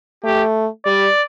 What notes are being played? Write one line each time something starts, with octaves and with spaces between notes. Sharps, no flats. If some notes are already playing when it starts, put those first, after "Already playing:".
A3 G4
G3 D5